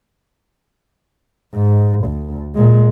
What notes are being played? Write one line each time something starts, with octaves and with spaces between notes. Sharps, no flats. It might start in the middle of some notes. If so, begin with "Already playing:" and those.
G#2
D2
A#2 G#3